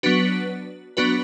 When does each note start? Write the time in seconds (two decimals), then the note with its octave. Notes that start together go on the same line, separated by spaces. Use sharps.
0.03 F#3 B3 D4 F#4 B4
0.97 F#3 B3 D4 F#4 B4